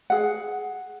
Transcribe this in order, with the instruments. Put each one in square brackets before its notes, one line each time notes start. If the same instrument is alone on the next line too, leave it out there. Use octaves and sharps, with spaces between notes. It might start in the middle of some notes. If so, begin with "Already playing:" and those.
[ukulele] G#4 F#5